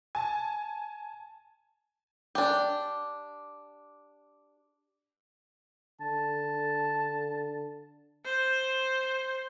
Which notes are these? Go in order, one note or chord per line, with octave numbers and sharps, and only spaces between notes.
G#5 A5
D4 G4
D3 A5
C5